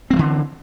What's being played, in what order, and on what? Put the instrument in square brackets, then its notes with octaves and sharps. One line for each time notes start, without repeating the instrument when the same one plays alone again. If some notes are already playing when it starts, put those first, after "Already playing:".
[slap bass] C4
G3
E3
D3